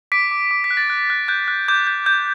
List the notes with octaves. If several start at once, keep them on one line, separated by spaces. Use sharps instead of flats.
D6 B6 D7
D6
D6
B6
F#6
A6
F#6
F#6
F#6 G6
F#6
D6 G6
G6
G6